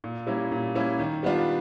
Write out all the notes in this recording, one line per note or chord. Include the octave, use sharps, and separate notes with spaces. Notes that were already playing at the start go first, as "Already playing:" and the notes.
A#2
G3 A#3 C#4 E4
A#2
G3 A#3 C#4 E4
D#3
G3 B3 D4 F4